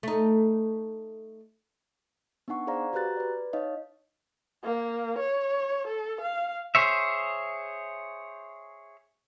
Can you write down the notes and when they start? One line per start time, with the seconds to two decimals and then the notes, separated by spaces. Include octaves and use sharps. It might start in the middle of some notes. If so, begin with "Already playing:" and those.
0.03 A3 D#4
2.48 B3 D4 D#4 F#5 C#6
2.67 G#4 C5 D5 F5 A#5
2.93 F#4 G4 B4 A#5 F#6 A6
3.17 B4 D5
3.53 D#4 C#5 D#5 F5
4.64 A#3
5.19 C#5
5.88 A4
6.21 F5
6.75 G#4 C5 C#5 E5